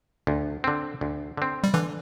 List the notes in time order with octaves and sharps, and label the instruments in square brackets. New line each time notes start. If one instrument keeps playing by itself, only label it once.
[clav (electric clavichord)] D2
D3 C4
D2
D3 C4
[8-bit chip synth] G3
[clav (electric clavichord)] D3 [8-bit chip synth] E3